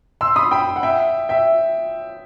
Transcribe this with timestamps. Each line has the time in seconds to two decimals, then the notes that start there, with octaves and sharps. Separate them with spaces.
0.21 C6 E6
0.36 B5 D#6
0.51 G5 B5
0.76 F#5
0.83 E5 G5
1.29 E5 G5